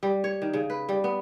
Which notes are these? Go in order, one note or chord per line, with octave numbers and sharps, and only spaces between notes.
G3
C#5
D#3
C#3
B4
G3
B3